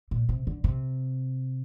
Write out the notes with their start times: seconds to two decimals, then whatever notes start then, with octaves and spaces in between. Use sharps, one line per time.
0.11 A#2
0.29 C3
0.47 D3
0.64 C3